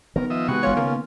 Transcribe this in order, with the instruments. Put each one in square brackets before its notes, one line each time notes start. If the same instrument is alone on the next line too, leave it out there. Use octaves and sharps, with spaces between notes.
[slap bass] D#3 B3 [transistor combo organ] A#4
[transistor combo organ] F3 D#5 E5
[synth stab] C3 [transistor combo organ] G#3 F#4 C#6 [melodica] B4
[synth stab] G#1 C#5 [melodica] C#4 F4
[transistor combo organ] C#3 [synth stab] A#3